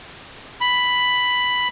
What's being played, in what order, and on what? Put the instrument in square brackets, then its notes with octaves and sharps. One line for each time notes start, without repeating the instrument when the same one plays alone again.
[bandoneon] B5